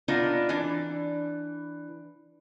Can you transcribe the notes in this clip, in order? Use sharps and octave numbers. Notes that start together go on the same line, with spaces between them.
B3 D4 D#4 F4 A#4
E3 D4